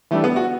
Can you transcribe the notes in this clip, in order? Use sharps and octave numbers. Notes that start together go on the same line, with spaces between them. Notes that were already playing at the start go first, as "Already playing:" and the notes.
E3 G3 A3 D4
B3
F#4